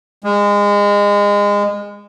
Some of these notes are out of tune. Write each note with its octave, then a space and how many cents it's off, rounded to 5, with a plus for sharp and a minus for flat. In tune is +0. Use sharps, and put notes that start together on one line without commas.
G#3 -25